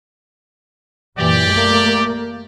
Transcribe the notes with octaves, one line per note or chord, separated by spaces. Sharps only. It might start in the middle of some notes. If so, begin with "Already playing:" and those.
F#2 A#2 E3 G4 D5
A3 A#3